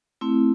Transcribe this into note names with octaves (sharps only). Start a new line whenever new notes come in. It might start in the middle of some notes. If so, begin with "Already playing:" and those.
A3 C4 E4